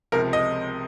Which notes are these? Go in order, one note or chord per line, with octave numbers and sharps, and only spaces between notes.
C#2 C3 F3 A#4
D#5